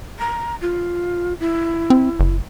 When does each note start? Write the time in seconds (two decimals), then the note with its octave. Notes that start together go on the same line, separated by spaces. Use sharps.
0.19 A#5
0.61 F4
1.40 E4
1.90 C4
2.20 F#1